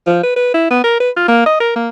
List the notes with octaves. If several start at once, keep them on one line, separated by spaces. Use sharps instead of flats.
F3
B4
B4
E4
B3
A#4
B4
F4
A#3
D#5
A#4
A#3